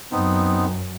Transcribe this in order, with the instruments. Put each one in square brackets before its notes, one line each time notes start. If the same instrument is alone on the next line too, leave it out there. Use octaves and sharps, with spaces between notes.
[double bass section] F#2 [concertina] B3 C4 D#4